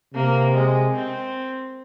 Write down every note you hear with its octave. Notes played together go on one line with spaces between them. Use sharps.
C3 A#3
G#3
C4